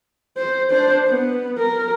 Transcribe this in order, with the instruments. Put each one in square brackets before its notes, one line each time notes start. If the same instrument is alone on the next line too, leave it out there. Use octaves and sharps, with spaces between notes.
[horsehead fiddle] C5
D4 C5
B3
A#4